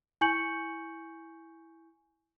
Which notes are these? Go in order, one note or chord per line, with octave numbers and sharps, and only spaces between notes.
E4 G#5 C#6 G6 C#7 F#7